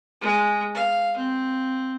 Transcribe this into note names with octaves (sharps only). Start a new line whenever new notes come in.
G#3
F5
C4